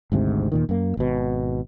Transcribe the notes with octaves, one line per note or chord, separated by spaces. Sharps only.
G#1 D2 G#2 C3
D#2 A#2 D#3
F#2 A#3
G#1 B2